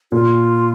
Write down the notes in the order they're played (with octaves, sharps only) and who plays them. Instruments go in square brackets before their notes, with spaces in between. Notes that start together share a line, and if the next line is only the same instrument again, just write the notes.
[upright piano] A#2 [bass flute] F4